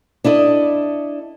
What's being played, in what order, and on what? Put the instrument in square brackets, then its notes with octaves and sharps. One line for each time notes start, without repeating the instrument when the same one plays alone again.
[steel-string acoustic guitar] D4 E4 A4 D#5